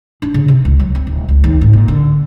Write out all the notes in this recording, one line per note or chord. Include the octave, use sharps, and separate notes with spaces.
D4
C#3
C3
C#2
F#3
C4
D1
C#2
D#2
G#1
A#2
D3